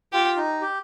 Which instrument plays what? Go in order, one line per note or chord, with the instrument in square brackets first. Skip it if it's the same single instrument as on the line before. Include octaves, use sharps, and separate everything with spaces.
[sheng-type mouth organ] F4 [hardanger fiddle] G4
[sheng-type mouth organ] D#4
G4